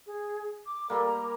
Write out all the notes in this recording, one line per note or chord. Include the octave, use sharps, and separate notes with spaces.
G#4
D6
G3 A#3 A4
A#5